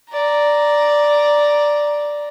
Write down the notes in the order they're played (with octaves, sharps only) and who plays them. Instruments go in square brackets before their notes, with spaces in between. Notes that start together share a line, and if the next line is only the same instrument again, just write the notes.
[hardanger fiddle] D5 A#5